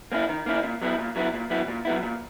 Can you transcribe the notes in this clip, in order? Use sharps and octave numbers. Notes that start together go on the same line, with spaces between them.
A#3 C#4 E4
D#3
A#3 C#4 E4
A#2
F#3 B3 E4
A#2
F#3 B3 E4
A#2
F#3 B3 E4
A#2
F#3 B3 E4
A#2